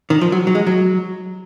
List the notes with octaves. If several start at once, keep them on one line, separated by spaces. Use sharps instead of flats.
D#3
F3
F#3
F#3
G#3
F#3